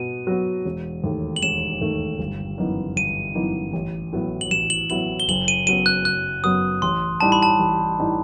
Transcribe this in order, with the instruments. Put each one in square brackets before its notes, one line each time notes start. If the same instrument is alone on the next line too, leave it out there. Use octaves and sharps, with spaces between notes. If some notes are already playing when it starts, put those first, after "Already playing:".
Already playing: [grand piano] B2 B3 F#4 [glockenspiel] D#7
[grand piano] F#3 B3 F#4
E1
D#2 D#3 A3
[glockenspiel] F#7
[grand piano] E1 [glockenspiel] E7
[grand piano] D#2 D#3 A3
G1
F#2 E3 B3 D#4
[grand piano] G1 [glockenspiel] D#7
[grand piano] F#2 E3 B3 D#4
A1
A2 F#3 B3 E4
[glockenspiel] F#7
[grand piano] A1 [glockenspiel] E7
[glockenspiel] F#7
[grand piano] A2 F#3 B3 E4 [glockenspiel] F#7
[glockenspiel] G7
[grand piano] F#1 [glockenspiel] F#7
[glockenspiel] D#7
[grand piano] F#2 F#3 B3 [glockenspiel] D#7
[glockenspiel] F#6
[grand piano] F#1 [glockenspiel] F#6
[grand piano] F#2 F#3 B3 [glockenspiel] D#6
[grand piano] A1 [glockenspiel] C6
[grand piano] A2 E3 G3 D#4 [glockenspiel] A5
[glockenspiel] B5
A5
[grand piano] A1
A2 E3 G3 D#4